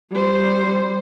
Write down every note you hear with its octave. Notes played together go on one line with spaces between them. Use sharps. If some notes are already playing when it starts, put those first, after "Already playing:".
G3 C5